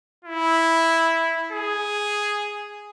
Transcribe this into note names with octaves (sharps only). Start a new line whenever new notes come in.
E4
G#4